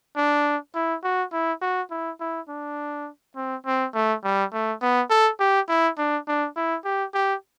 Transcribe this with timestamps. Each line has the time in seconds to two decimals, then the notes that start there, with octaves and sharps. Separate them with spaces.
0.16 D4
0.75 E4
1.03 F#4
1.32 E4
1.61 F#4
1.90 E4
2.20 E4
2.48 D4
3.36 C4
3.66 C4
3.94 A3
4.24 G3
4.53 A3
4.82 B3
5.10 A4
5.40 G4
5.69 E4
5.98 D4
6.27 D4
6.56 E4
6.84 G4
7.14 G4